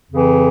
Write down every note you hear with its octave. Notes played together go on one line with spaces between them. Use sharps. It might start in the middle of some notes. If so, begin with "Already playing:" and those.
F2 C#3 E3